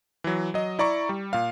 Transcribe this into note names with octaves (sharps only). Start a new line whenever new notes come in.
E3 F#3
F#3 D#5
E4 D5 A#5 C#6
G3
A#2 F5